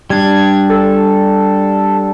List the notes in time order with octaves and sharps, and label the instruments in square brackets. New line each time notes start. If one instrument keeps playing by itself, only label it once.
[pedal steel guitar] G3 D4 [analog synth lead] G#6
[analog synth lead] A4